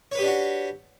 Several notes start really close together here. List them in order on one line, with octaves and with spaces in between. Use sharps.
C#5 B4 G4 D4 F#4